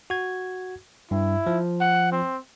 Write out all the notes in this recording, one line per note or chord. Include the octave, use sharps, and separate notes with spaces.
F#4 G#6
G2 E4
F3
F#5
C4